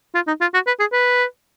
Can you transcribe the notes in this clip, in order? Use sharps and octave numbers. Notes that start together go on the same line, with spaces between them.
F4
D#4
F4
F#4
B4
G#4
B4